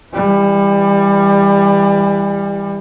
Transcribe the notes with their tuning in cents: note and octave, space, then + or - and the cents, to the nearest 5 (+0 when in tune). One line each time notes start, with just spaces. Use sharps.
E3 +5 G3 +25